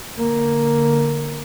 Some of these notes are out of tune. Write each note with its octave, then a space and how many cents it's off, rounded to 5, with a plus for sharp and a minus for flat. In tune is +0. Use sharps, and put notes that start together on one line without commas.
D3 +0 A#3 +0